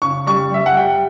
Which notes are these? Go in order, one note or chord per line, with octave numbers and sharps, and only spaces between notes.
C#3 C#6
G3 C#6
G3 E5
F#5
G3 G5